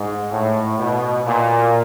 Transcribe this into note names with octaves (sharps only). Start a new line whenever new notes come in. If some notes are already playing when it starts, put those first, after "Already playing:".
Already playing: G#2
A2
B2
A#2